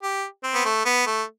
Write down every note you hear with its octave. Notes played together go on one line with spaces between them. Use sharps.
G4
C4
B3
A3
B3
A3